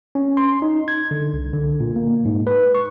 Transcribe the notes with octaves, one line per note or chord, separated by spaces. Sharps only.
C#4
C6
D#4
G#6
D3
C2
D3
A#2
A#3
G#2
B4
C#6